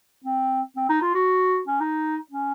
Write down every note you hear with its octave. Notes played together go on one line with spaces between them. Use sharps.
C4
C4
D#4
F4
F#4
C#4
D#4
C#4